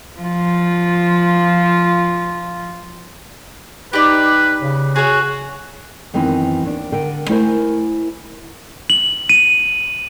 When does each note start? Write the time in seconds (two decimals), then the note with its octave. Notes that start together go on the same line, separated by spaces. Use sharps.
0.20 F3 F4
3.93 D#4 G4 B4 D5
4.61 C#3
4.96 F#4 G#4 C#5
6.13 F#2 D#3 E3 B3 C4
6.64 D#2 D4
6.92 D3 A#4 G5
7.29 A3 E4 A#4 C5 F#5 G#5
8.90 F#7
9.29 D#7